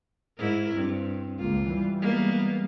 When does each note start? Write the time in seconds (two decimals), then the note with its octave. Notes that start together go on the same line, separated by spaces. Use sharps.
0.38 G#2 E4 A#4
0.73 G2 C4
1.38 C#2 A#3 F4
1.68 E3 G3
2.00 G#3 A#3 B3